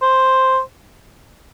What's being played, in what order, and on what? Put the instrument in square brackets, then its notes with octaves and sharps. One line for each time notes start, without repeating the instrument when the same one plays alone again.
[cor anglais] C5